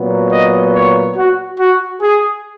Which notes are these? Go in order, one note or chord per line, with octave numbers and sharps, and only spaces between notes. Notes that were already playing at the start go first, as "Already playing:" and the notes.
Already playing: A#2 F#3 B3
D#5
C#5
F#4
F#4
G#4